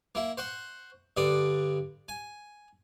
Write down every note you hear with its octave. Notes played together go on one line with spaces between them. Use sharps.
A#3 E4
C5 F#5 C#6
G2 D3 D5 D#6
G#5